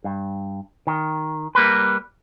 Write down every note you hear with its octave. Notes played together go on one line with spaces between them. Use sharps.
G2
D#3
G3 A#3 A#4 B4